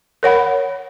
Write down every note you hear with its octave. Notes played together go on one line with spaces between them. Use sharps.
A#4 C#5 F#5 B5